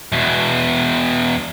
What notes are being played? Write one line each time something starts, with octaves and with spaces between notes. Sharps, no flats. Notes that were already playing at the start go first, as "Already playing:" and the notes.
E2 B2